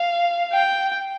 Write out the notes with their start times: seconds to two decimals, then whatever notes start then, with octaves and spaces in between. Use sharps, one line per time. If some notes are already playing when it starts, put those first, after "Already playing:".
Already playing: F5
0.52 G5